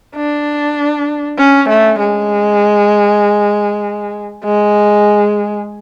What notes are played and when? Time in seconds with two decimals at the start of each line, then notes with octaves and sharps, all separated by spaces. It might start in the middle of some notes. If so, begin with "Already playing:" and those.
0.16 D4
1.38 C#4
1.69 A3
2.00 G#3
4.45 G#3